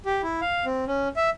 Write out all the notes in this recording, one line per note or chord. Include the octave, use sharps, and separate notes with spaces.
G4
E4
F5
C4
C#4
E5